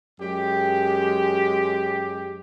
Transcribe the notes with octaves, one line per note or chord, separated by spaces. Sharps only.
F#2 G#3 G4